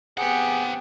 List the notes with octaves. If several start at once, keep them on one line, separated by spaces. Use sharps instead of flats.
B3 C4 G4 G#4 F#5